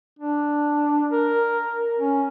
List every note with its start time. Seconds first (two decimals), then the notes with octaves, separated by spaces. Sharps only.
0.19 D4
1.11 A#4
1.98 C#4